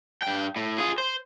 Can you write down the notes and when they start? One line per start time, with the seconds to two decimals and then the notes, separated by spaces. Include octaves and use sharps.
0.22 G2 G5
0.56 A2
0.78 F4 G#4
0.98 C5